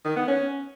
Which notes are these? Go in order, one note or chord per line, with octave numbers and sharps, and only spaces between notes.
D#3
B3
C#4